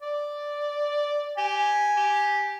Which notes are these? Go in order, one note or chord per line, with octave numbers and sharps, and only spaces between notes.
D5
G4 G#5
G4